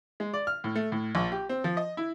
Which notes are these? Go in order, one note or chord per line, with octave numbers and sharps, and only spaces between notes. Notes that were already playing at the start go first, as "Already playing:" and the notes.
G#3
D5
F6
A2
A3
A2
A#1
G4
C4
F3
D#5
E4